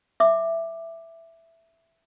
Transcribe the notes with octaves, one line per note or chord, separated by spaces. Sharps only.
E5 D6